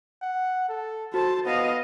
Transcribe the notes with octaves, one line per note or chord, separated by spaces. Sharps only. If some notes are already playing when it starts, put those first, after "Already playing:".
F#5
A4
F#4 A4 C5 A5
B3 D#5 F5